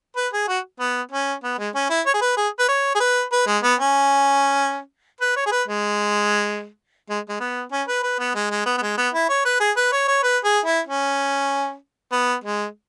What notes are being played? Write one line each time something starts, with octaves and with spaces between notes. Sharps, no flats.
B4
G#4
F#4
B3
C#4
B3
G#3
C#4
E4
C#5
G#4
B4
G#4
B4
C#5
G#4
B4
B4
G#3
B3
C#4
B4
C#5
G#4
B4
G#3
G#3
G#3
B3
C#4
B4
B4
B3
G#3
G#3
B3
B3
G#3
B3
E4
C#5
B4
G#4
B4
C#5
C#5
B4
G#4
E4
C#4
B3
G#3